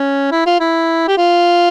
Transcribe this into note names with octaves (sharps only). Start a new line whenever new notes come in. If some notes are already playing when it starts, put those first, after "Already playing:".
Already playing: C#4
E4
F4
E4
G4
F4